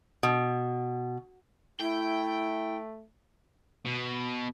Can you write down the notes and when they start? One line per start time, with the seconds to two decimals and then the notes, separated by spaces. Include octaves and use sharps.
0.23 B2
1.80 A3 E4 G5
3.85 B2